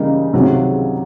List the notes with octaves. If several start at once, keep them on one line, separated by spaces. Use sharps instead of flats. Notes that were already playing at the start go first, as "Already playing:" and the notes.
Already playing: C#3 E3 G3 A#3 D#4
C#2 C3 D#3 F#3